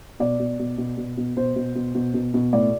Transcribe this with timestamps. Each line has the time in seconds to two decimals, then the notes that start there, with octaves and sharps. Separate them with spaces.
0.20 B2 D5
0.39 B2
0.59 B2
0.78 B2
0.97 B2
1.17 B2
1.36 B2 C5
1.56 B2
1.75 B2
1.95 B2
2.14 B2
2.34 B2
2.53 A2 D5